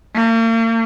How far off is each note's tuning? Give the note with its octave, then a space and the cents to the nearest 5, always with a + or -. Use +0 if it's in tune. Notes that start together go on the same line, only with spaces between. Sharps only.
A#3 -40